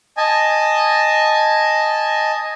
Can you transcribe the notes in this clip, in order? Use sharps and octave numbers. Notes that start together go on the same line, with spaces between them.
D#5 G#5 A5